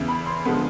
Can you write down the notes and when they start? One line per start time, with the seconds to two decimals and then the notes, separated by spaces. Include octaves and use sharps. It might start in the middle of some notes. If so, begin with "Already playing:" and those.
Already playing: E2 C#3 E3
0.08 B5
0.26 C6
0.45 D3 F3 G#3 B3